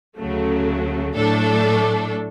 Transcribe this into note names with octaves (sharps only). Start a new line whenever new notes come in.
D2 C#3 F#3 A3
A2 F#3 A3 D4 A4